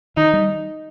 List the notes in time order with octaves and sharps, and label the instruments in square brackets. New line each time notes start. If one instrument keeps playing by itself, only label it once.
[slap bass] D#3 [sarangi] D#4
[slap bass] G3